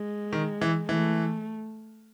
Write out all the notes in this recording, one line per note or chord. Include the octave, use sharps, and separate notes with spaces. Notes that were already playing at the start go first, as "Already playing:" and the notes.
Already playing: G#3
D#3
E3
E3 A3